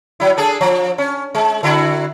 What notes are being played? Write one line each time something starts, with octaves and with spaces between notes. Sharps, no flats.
F#3 E4
D4 G#4 A4
F3
C#4
G#3
D3 E4 F#4